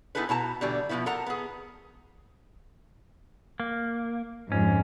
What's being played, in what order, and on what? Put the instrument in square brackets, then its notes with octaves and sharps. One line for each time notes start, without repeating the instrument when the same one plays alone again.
[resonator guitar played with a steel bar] B3 D#4 E4 G#4 A4 B4
B2 E4 A5 A#5
B2 D3 E3 G3
B2 F3 A3 B3 E4
A4 A#4 F#5 A5 A#5
B3 G#4
[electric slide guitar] A#3
[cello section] F2 G#2 [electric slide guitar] C#4